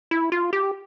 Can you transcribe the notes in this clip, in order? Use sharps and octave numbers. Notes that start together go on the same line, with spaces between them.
E4
F4
G4